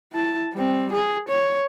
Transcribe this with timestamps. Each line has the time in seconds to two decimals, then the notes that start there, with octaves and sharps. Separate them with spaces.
0.13 E4 A5
0.54 G3 C4
0.92 G#4
1.29 C#5